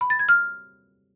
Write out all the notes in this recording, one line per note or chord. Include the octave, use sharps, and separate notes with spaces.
B5
A6
G#6
F6